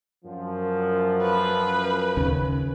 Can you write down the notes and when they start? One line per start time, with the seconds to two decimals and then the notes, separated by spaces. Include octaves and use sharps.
0.25 F#2 F3
1.21 B4
2.17 D#2 C#3